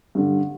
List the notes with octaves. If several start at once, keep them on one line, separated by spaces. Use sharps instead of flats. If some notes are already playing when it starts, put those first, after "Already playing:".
G2 D3